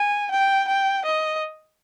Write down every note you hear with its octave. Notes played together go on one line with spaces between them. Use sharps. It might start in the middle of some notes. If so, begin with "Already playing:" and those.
Already playing: G#5
G5
G5
D#5